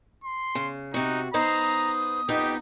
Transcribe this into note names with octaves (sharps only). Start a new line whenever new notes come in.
C6
C#3
C3 D#4 F#4
B3 D#4 C5 A#5 D#6
F2 B3 D#4 G4